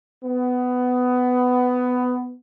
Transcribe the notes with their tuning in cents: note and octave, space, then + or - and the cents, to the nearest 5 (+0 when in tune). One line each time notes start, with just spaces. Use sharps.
B3 +15